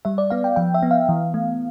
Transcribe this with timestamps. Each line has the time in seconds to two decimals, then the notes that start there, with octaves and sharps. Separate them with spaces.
0.05 G3 E5
0.18 D5
0.30 B3 F5
0.44 G5
0.56 F3 G5
0.74 E5
0.83 B3
0.91 F5
1.09 E3
1.34 A3